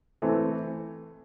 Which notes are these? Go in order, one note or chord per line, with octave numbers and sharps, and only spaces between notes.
E3 A3 C4